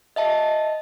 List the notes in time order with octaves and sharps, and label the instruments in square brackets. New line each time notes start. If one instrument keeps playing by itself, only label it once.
[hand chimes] D#5 E5 A5